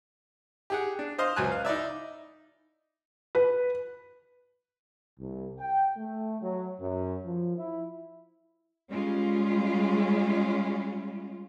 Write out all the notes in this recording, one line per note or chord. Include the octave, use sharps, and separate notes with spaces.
G4 G#4 F#5
D4
C5 D#5 F5 C6
C#2 F#3 G#5 F#6
F5
D#4 E4 D5 E5
B4
C2
G5
A3
F#3
F#2
F3
E4
G3 G#3 C#4 F4